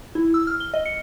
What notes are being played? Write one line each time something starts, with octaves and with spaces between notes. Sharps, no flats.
E4
E6
F6
G7
D#5
C#7